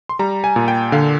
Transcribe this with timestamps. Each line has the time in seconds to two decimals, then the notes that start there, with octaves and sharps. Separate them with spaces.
0.09 C6
0.19 G3 A#5
0.44 G#5
0.56 A#2
0.68 G5
0.92 D3 F5